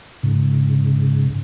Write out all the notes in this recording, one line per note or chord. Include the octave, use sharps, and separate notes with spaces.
G#2 C#3